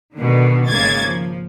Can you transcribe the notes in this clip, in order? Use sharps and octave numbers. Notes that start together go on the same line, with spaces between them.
B2 D3 D#3
G#1 C#3 G#3 A#3 G#6 A6
F3